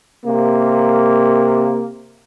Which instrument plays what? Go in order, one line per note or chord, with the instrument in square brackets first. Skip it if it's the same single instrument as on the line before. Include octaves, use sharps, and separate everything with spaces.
[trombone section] C3 A#3